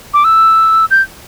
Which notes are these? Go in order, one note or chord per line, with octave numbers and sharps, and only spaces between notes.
D6
E6
G6